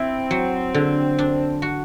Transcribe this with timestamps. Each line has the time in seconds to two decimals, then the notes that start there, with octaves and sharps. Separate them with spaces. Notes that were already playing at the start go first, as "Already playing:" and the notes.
Already playing: C4 E4
0.31 F#3
0.74 D3
1.19 D4
1.62 F#4